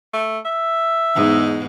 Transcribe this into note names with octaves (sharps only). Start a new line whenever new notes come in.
A3
E5
E2 G#2 D#4